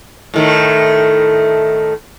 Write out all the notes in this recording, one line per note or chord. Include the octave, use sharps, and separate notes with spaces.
A2 D#3 A3